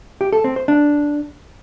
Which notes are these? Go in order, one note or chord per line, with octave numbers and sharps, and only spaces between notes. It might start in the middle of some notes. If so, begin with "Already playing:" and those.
G4
A4
C4
C5
D4